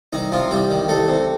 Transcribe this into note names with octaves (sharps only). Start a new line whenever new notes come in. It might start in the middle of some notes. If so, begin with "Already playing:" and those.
C2 D#3 D#4
C3 F3 F4
C2 G3 G4
D#3
C2 A3 A4
C3